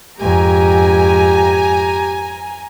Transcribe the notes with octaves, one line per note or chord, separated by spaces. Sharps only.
F2 G#2 G4 G#5 A#5